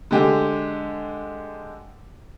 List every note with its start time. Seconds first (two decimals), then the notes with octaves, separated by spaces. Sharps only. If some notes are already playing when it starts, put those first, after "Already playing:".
0.11 D3 G#3 G4